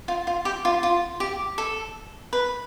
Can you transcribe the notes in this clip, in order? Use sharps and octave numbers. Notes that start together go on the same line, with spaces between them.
F4
F4
G4
F4
F4
G4
A4
B4